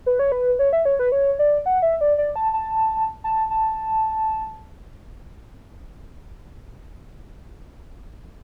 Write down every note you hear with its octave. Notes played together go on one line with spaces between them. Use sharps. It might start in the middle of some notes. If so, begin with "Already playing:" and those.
B4
C#5
B4
C#5
E5
C#5
B4
C#5
D5
F#5
E5
D5
D5
A5
A5
A5
A5